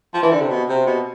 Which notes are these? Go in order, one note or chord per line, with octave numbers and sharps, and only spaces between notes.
F3
E3
D3
C3
B2
C3
B2